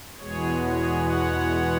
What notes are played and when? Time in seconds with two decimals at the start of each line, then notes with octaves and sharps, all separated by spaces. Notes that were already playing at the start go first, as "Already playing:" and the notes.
0.19 E2 B2 G#3 B3 G#4 C#5
0.61 G#4 C#5
1.05 C#5 F#5